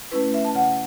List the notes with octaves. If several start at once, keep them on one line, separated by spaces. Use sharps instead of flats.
A3 C#4 E4 B4
E5
A5
C#3 F#5